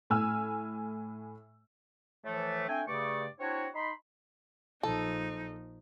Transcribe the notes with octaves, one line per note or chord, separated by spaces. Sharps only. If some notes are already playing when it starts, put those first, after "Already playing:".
A2 G#5 E6 F6
A2 E3 F3 A3
A3 C4 D4 G5 G#5
G2 C#3 A3 D5 C#6 D6
C4 D4 E4 F#4 C#5
D#4 B5 C6
A#1 F3 D#4 A4